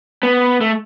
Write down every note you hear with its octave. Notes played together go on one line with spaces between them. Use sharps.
B3
A3